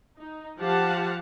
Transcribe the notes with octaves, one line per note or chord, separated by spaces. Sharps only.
D#4
F3 G4 F5 F#5 A5